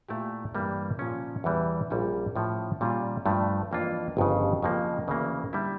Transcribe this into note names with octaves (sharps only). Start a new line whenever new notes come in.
A#2 A3 E4 G4
G2 E3 G3 A#3
A#2 F3 C#4
E2 E3 G3
A#1 A#2 G3 C#4
A2 F3 C#4
A#2 G3 C#4 F4
G2 F3 A3
F2 E3 A#3 D4 F4
G1 F2 C#3
F2 C#3 F3 A#3
D2 C#3 E3 A#3 C#4
D3 G3 A#3 E4